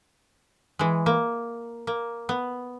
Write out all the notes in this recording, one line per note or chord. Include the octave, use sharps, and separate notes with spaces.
E3 G#3
A#3
A#3
B3